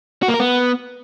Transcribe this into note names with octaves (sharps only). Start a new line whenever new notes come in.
F#4
A#3
A#4
B3